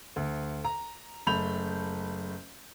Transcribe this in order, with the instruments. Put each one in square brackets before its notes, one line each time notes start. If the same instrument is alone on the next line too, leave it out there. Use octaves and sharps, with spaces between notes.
[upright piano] D2
A#5
F#1 A3 B5 G6 F7